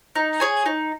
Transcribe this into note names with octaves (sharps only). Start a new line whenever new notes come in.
D#4
G#4 C#5 G#5
D#4